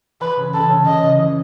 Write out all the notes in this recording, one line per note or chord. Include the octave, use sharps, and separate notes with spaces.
E3 B4
C#3
C#3 A4
C#3
C#3 D#5
C#3
E3